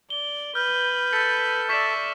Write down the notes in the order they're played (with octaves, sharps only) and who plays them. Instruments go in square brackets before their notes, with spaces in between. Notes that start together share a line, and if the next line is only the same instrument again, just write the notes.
[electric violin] D5 [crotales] G7
[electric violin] B4 [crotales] F6 [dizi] G6
[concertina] A4 A5 [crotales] A6 B6 C#7
[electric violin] D5 E5 [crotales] C#6 B6 E7